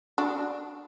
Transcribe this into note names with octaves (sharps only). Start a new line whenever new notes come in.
D4 F#4